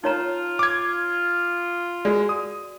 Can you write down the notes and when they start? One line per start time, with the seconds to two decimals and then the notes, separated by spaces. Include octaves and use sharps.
0.04 D#4 F4 C#5 A#5
0.59 D6 G#6
2.05 G#3 F#4 D5
2.29 D#6